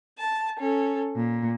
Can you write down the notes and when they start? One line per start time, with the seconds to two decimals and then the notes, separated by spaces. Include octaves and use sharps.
0.19 A5
0.59 C#4 A4
1.18 A#2